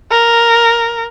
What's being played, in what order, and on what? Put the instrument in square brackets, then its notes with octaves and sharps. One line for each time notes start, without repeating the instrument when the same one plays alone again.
[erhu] A#4